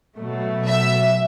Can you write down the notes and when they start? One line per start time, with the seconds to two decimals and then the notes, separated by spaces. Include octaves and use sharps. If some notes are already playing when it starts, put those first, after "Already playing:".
0.18 B2 F#3 A3
0.67 E5